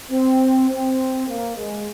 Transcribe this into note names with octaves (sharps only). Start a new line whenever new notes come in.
C4
C4
A#3
G#3